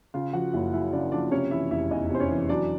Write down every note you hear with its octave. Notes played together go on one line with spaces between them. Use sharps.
C#3 F4 F5
F3 F#4 F#5
F#1 E4 E5
F#2 E4 E5
C#3 D4 D5
F3 D4 D5
C3 C#4 C#5
E3 E4 E5
F1 E4 E5
E2 D#4 D#5
C3 C5
C#4 C#5
E3
F#3 D4 D5